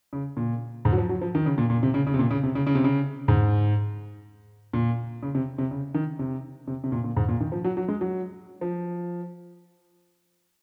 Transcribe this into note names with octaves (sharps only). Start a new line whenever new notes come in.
C#3
A#2
G#2
F#3
F3
F#3
F3
D#3
C#3
A#2
A#2
C3
C#3
C#3
C3
A#2
C#3
C3
C#3
C#3
C3
C#3
G#2
A#2
C#3
C3
C3
C#3
D#3
C3
C3
C3
A#2
A#2
G#2
A#2
D#3
F3
F#3
F#3
G#3
F#3
F3